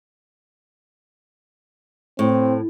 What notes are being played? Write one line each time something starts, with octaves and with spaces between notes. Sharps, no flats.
A2 C4